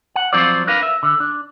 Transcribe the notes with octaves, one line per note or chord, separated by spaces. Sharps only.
F#5
F3 F#3 C4 F4 C5 D5
D4 A#4 B4 F5
E5
D3
D4